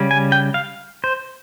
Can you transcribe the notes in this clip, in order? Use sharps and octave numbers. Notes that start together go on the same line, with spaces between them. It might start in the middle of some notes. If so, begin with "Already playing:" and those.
Already playing: C#3 G3 C#4
G#5
G5
F5
C5